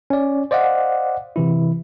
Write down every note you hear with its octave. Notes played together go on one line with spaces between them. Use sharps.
C#4 D5
C5 D5 D#5 F5 F#5
C3 E3 E4